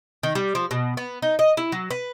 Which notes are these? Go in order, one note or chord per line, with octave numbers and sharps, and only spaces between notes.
D#3
G3
F3
B2
B3
D#4
D#5
E4
F#3
B4